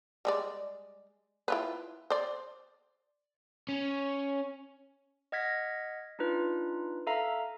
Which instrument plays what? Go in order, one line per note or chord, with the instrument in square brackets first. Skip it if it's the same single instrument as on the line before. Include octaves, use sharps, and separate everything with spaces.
[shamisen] G3 G#3 D5
E4 F4 B4
C5 D5
[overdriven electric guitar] C#4 C#5
[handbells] D#5 F#5 F6 G#6 A#6 B6
D4 D#4 F4 B4
A4 E5 F5 A#5